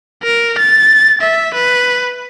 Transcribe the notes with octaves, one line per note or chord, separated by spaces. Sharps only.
A#4
A6
E5
B4